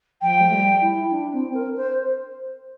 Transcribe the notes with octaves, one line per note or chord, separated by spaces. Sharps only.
F3 G5
A3
G3
E4
D4
C4
A#4
C5